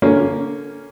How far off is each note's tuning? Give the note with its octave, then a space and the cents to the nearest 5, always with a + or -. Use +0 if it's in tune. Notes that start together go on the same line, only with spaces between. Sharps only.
D3 -25 A#3 +0 C#4 +5